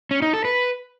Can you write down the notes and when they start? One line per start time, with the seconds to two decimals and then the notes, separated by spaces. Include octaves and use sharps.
0.11 C#4
0.22 D#4
0.33 A4
0.45 B4